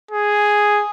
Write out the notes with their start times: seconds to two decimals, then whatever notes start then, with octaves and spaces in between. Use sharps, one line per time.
0.11 G#4